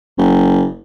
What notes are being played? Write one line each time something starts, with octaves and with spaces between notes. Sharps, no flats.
F#1